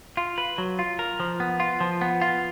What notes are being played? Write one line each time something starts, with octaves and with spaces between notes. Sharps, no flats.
F4
B4
F#3
F4
A#4
F3
B3
F4
F3
B3
F4